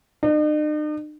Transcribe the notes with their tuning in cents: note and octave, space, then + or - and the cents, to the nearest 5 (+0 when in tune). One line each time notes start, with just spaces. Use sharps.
D#4 -45